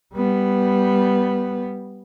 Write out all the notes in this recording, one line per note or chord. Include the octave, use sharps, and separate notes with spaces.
G3 B3